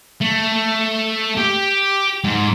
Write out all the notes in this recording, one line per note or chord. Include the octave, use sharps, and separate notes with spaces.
A3
G4
G#2